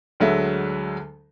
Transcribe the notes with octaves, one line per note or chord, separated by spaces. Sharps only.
D2 D3 F#3 G#3 E5